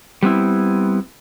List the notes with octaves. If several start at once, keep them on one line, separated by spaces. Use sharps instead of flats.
G3 B3 C4 E4